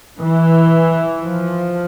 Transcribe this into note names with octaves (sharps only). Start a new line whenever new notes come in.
E3
F3